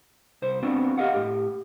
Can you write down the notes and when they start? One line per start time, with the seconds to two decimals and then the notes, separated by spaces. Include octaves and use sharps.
0.42 C2 C5
0.63 B3 C4 D4 F4 F#4
0.98 G4 A#4 D#5 F5 F#5
1.14 A2 G4